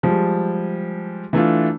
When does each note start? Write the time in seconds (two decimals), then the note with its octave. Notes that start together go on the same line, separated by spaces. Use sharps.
0.03 F3 G3 G#3
1.33 E3 A3 D4 F4